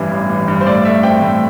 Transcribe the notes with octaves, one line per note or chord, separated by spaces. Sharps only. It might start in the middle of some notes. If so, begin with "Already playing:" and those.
Already playing: A1 G2 E3
A1
A1
G2
C5
A2 D5
A3 E5
C4 G5
A2